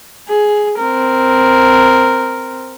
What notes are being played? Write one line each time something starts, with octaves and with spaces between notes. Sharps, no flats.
G#4
C4 A#4